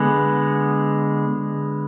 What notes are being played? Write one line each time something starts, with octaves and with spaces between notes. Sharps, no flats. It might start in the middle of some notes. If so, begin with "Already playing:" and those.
Already playing: D3 G#3 B3